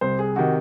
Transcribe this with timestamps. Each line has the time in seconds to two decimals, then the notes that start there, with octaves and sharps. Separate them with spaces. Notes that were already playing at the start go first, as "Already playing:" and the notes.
0.01 C2 C5
0.19 G#4
0.36 C3 D#3 F#4